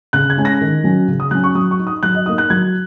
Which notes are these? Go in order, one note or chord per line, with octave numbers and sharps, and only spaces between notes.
C#3 F#6
G#6
G#3 C#4
A#6
D#3
F#3 C#4
C#3
D#6
F#3 C#4 F#6
C#6
F#3 D#6
C#6
D#4
D#6
F#3 F#6
D#5
A#3 D#4 D#6
F#6
F#3 G#6